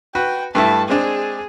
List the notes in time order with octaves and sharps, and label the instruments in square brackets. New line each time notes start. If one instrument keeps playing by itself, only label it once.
[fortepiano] F#4 B4 [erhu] G5
[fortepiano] G2 A3 E4 [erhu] A5
[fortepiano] G#3 C4 D4 [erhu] G#4